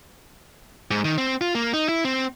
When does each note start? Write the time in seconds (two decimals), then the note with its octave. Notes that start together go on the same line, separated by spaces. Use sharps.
0.91 G#2
1.05 D#3
1.18 C4
1.41 F4
1.55 A#3
1.73 D#4
1.89 E4
2.05 C4